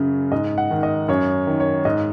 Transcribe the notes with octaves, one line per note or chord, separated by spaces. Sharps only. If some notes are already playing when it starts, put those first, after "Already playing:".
Already playing: F#2 C#3
G#2 D#5
F#5
D#3
D#5
F#2 C#5
D#3
C#5
G#2 D#5